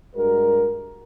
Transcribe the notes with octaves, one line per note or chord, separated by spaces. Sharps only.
G2 G#3 F#4 A#4